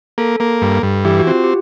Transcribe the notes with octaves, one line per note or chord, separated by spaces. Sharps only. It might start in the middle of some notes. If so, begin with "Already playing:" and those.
A#3 A4
A#3
G2
G2
E3 G4
F#4
C4 F4
G4